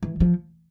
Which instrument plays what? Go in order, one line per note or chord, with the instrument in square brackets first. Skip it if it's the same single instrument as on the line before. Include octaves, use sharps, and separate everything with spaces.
[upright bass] E3
F3